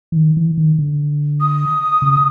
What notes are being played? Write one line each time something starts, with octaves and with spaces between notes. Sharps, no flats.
E3
D#3
E3
D#3
D3
D#6
C#3